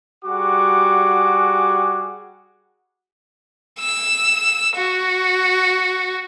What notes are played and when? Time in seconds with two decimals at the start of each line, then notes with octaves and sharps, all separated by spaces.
0.25 G3 F#4 G#4 F#5 D6
3.80 E6
4.76 F#4